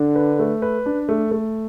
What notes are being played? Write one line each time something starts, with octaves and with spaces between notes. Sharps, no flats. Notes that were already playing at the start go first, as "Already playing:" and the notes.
Already playing: D3 D4
B4
A3
B4
D4
A3
A3